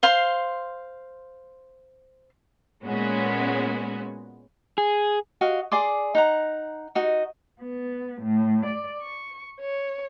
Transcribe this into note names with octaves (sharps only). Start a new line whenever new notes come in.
C5 F5 C6
A#2 G#3 B3 C#4 F#4
G#4
F#4 D#5 F5
G#4 D5 C6 D6
D#4 F#5 A#5
D#4 F#4 D#5
B3
A2
D5
C#6
C#5